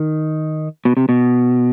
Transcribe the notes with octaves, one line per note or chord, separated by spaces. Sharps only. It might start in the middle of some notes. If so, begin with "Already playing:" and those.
Already playing: D#3
B2
C3
B2